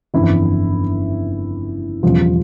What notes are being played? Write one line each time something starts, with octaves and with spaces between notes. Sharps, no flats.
G1 F2 C#3 E3 E4
E1 E2 C#3 E3 F3 G3 F4